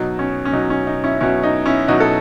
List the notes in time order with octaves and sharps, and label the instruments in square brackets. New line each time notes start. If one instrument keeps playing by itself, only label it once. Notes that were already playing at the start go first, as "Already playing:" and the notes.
Already playing: [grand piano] B2 F#3 D#4
C#4
C#4
B2 F#3 D#4
C#4
D#4
C#4 E4
B2 F#3 C#4 E4
D#4
C#4 E4
B2 F#3 D#4 F#4
A4